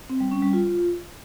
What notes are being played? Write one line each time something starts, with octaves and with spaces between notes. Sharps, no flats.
C4
G3
C#4
G3
F4